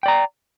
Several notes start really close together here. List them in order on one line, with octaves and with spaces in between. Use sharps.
G5 D5 A#5